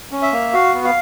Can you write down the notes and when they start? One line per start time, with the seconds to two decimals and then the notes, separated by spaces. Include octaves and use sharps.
0.12 C#4
0.22 E5
0.32 A#3
0.53 F#4 F5
0.74 B3
0.85 F5